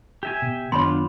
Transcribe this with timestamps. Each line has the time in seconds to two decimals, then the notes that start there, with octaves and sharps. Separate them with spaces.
0.23 G4 E5 G#5
0.42 B2
0.72 F#2 D#3 B3 D4 F4 C#5 B5 C6